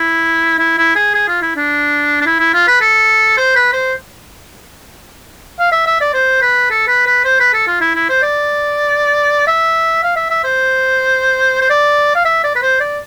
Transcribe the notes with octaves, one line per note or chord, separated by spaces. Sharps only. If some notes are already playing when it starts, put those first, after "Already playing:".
Already playing: E4
E4
E4
G#4
G#4
F4
E4
D4
D4
E4
E4
F4
B4
A4
C5
B4
C5
F5
E5
E5
D5
C5
B4
A4
B4
B4
C5
B4
A4
F4
E4
E4
C5
D5
E5
F5
E5
E5
C5
C5
D5
F5
E5
D5
B4
C5
D5